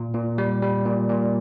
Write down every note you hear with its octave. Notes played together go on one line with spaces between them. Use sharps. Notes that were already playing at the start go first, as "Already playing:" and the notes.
Already playing: A#2
A#2
G3
G3
A#2
A#2